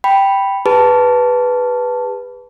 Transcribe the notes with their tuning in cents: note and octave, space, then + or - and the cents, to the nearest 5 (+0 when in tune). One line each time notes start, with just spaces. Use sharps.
G5 +0 B5 +0
G#4 -45 B4 +0 A5 +0